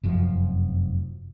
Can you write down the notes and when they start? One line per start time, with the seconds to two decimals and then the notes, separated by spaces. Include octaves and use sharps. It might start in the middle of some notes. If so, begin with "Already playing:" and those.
0.03 F1 F#2 F3